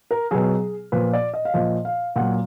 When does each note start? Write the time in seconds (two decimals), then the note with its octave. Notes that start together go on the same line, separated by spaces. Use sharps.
0.11 A#4
0.31 B2 F#3 G#4
0.92 A#2 F3 B4
1.13 D5
1.34 D#5
1.45 F5
1.54 A#2 F3 D#5
1.85 F5
2.16 A#2 F#3 F#5